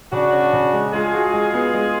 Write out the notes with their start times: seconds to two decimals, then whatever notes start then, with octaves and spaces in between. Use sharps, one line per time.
0.12 C#3 D4 F#4
0.32 C#4
0.53 C#3
0.74 G#3
0.93 G#3 F4 G#4
1.14 F#4
1.34 G#3
1.54 B3
1.74 G#3